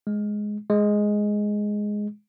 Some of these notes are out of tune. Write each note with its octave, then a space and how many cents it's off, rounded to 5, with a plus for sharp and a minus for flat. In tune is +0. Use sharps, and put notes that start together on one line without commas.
G#3 +10
G#3 +5